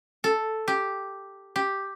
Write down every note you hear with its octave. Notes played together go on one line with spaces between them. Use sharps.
A4
G4
G4